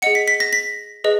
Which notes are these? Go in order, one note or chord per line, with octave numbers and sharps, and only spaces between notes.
G#4 D#5 F#5 C#7
B6
B6
A#6
B6
G#4 B4 D#5